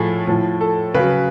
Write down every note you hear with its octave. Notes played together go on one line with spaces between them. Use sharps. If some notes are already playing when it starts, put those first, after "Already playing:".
Already playing: A2 F3 G#4 A4
A2 F3
A4
C#3 F#3 B4